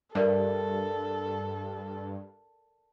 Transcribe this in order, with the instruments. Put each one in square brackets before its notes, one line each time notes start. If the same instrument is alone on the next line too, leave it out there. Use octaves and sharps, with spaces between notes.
[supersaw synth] G2 [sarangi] A4 [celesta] A#4 D5 E5